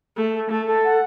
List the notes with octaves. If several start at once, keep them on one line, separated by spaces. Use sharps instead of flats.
A3 A4
A4
A3 A4
A4
F#5